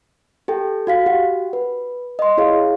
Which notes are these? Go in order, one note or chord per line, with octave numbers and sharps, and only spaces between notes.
G4 A4 G5
F#4 F5 B6
F#4 G4 F#5
B4
D#5 C6
E4 G#4 C#5 F5